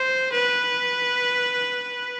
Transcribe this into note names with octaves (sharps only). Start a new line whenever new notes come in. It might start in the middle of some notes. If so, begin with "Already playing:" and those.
Already playing: C5
B4